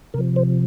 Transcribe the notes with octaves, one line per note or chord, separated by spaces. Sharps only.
C3 F3 A#4
C5